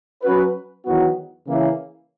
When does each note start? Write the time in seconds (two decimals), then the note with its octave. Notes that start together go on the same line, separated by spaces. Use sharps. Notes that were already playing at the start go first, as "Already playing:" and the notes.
0.23 F#3 C#4 F#4 B4
0.85 E2 D#3 F#3 B3 F#4
1.47 C#3 E3 A#3 C#4 E4